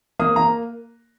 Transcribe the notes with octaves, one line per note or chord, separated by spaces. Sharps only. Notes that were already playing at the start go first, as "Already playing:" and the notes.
A#3 D#6
A#3 A#5